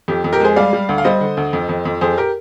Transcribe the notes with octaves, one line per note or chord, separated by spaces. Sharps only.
F2 G4
F2
G4 A#4
G#3 G#4 C5
G3 D5 F5
G3
D2
F5
G3 C5 D#5
D3
D2
F2
F2
F2
F2 G#4 C5
G4 A#4